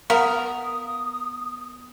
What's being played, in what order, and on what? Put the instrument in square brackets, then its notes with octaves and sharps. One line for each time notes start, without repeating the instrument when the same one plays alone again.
[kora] B3 [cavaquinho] A#4 [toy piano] F5 [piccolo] D#6